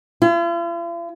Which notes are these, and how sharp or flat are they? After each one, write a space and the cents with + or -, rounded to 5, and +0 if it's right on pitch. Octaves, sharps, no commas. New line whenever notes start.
F4 -45